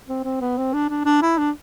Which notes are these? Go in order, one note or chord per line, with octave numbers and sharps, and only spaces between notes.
C4
C4
B3
C4
D4
D4
D4
E4
D4